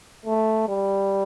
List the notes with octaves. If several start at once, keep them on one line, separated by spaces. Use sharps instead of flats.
A3
G3